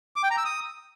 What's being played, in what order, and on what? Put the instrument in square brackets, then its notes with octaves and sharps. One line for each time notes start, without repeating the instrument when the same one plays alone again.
[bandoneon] D6
G5
A#5
E6
D#6